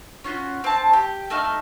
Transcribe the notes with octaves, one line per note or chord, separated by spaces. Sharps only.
C#4 F4 F#4
C4 A5
G4
A3 D#4 E5 F5